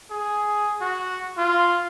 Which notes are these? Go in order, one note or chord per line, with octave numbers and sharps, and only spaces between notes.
G#4
F#4
F4